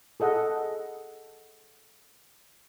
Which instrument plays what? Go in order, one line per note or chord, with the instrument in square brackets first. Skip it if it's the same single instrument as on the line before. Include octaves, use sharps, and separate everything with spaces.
[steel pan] G#4 A4 D#5 F#5